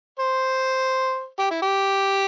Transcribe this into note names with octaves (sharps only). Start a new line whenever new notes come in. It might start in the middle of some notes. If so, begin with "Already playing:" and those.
C5
G4
E4
G4